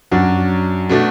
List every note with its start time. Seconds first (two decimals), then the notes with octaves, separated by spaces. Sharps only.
0.12 F#2 F#3 D4 F#4
0.89 B2 A3 D4 F#4